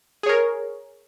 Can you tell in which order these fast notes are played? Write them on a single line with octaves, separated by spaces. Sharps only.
G#4 C#5 A#4